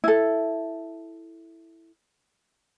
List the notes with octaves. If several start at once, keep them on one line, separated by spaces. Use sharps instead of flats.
E4 A4